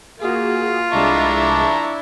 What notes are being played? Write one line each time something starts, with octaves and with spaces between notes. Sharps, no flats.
A#3 F4 F#4 G#4
C2 G#3 D4 E4 E5 A5 A#5 C#6